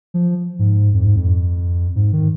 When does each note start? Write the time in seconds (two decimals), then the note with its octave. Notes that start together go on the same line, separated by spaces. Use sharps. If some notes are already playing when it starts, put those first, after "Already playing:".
0.14 F3
0.59 G#2
0.93 F2
1.05 G#2
1.16 F2
1.95 G#2
2.13 D#3